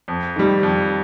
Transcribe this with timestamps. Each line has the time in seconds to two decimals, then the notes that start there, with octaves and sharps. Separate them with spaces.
0.08 F2
0.36 D#3 G3
0.63 F2